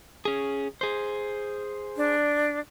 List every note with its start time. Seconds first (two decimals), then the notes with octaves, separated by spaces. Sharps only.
0.25 C#4 G#4
0.81 G#4 C5
1.97 D4